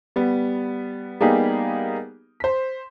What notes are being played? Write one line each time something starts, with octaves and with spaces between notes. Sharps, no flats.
G3 B3
G3 A#3 B3 D#4 G4 G#4
C5 B6